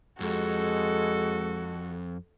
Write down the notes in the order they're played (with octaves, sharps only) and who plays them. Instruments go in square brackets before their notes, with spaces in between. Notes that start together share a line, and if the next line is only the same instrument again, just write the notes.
[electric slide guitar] F2 [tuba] G#3 [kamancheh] F#4 A4